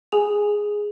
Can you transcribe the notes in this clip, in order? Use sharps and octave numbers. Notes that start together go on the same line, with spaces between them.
G#4 G#5 F7